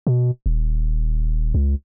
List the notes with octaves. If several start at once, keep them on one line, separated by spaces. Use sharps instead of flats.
B2
D#1
C#2